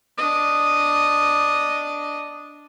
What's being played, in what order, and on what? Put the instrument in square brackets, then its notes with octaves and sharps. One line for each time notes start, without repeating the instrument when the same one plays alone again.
[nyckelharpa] D4 D#5